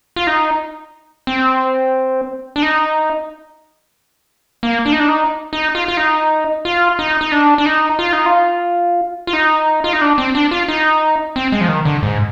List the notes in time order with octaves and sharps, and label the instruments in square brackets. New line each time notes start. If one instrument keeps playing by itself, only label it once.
[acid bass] F4
D#4
C4
D4
D#4
A#3
D4
D#4
D4
D#4
D#4
F4
F4
D#4
F4
D#4
D#4
D4
D4
D#4
F4
D#4
F4
F4
D#4
F4
D#4
D4
C4
D4
F4
D#4
C4
G#3
F3
D#3
D3
G#2